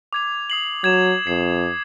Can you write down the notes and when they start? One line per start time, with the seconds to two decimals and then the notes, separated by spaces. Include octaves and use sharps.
0.13 D6 G#6 F7
0.50 D#6 C7 F#7
0.84 F#3 G#6 E7
1.27 F2 C7